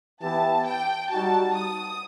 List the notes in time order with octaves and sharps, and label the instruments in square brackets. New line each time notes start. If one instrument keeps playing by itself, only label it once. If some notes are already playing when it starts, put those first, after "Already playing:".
[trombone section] E3 B3 E4 G4 [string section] A5
[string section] G5
[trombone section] G3 D#4 F#4 [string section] A5
[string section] D#6